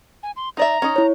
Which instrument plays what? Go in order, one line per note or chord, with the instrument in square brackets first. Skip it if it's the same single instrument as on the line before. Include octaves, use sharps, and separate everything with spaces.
[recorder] G#5
C6
[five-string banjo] D#4 D5 E5 [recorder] A#5
[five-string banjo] C#4 D#4
[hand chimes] E4 C#5